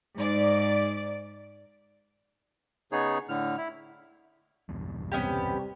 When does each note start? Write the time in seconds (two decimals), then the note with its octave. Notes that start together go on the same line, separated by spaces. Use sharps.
0.17 G#2 D5
2.92 C#3 B3 D#4 G#4 C#5
3.29 A2 D3 F6
3.57 E4
4.69 B1 E2 G2
5.12 C3 G3 B3 C#4 G4